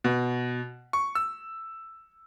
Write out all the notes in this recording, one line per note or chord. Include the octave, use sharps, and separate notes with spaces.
B2
C#6
E6